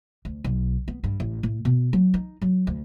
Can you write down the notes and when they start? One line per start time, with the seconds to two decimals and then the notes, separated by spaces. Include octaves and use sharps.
0.25 D2
0.44 B1
0.88 B3
1.04 G2
1.20 A1
1.43 A2
1.65 B2
1.93 F#3
2.14 D#4
2.42 F#3
2.67 D2